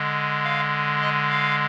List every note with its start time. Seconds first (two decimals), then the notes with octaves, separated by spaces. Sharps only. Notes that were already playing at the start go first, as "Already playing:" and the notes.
Already playing: D3 G#3
0.44 F5
1.01 D#5
1.30 F5